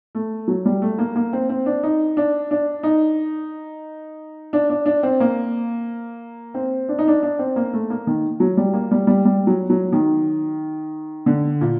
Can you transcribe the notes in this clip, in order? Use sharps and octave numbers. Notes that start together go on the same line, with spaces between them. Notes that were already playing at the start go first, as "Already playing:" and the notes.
A3
F#3
G3
A3
A#3
A#3
C4
C4
D4
D#4
D4
D4
D#4
D4
D4
D4
C4
A#3
C4
D4
D#4
D4
D4
C4
A#3
A3
A#3
D#3
F#3
G3
A#3
G3
G3
G3
F#3
F#3
D#3
D3
A#2